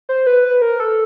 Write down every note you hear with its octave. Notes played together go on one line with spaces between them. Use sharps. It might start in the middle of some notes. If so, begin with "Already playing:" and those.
C5
B4
A#4
A4